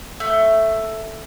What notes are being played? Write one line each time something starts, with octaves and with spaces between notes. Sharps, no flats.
A3